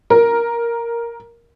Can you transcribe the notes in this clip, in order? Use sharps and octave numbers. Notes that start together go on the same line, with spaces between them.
A#4